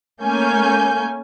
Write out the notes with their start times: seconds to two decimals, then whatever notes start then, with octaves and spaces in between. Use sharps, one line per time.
0.21 A3 A#3 C#4 G#5 G6